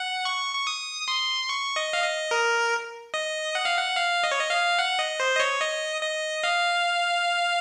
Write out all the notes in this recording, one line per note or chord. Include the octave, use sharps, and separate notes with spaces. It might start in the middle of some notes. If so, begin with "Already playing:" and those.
Already playing: F#5
C#6
C#6
D#6
C6
C#6
D#5
F5
D#5
A#4
D#5
F#5
F5
F#5
F5
D#5
C#5
D#5
F5
F#5
D#5
C5
D#5
C#5
D#5
D#5
F5